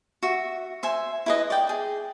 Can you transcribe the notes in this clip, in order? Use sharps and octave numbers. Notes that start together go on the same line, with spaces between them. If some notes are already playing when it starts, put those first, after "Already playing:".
F#4 E5
C5 E5 G#5
E4 B4 D#5
D5 G5
G#4 G5